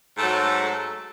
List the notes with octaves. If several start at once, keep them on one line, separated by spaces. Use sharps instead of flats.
G#2 F#3 A3
A3
A3